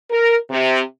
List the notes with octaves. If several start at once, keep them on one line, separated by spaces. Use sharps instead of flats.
A#4
C3